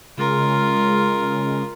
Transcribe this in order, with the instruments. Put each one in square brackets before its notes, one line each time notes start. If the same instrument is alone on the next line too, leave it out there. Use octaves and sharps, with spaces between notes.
[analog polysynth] C#3 G#3 [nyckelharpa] F4 A#4